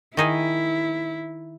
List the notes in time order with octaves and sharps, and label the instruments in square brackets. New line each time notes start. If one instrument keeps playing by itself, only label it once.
[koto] D#3 D#4 G#4 [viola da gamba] E4